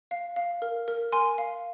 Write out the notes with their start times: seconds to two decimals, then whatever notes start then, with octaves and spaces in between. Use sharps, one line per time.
0.11 F5
0.36 F5
0.62 A#4
0.88 A#4
1.12 A#4 G#5 C6
1.38 F5